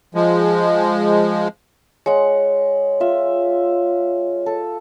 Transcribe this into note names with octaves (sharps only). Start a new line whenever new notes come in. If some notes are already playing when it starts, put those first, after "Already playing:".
F3 G#3
G#3 C#5 F#5
F4 E5
A4